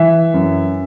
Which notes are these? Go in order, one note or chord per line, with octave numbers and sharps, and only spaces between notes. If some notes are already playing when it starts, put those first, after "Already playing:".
Already playing: E3 E5
F#2